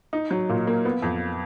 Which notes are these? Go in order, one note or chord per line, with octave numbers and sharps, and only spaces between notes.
D#4
F#3
A#2
A#3
B3
F2